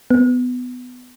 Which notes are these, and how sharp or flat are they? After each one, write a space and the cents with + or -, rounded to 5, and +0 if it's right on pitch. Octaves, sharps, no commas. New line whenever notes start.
B3 +15